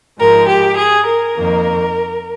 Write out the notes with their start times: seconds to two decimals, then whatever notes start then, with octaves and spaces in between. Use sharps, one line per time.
0.19 G#2 F3 G#3 A#4
0.48 G4
0.76 G#4
1.05 A#4
1.34 F2 D#3 A#3